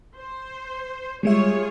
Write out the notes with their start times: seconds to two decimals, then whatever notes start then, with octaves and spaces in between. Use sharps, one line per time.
0.16 C5
1.23 G3 G#3 F4 G#4 C#5 E5